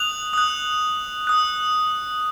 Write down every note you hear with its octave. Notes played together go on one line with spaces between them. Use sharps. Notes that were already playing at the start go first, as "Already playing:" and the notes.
Already playing: D#6 F#6 F7
D#6 F#6
D#6 F#6